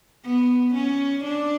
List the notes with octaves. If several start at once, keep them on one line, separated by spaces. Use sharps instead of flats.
B3
C#4
D4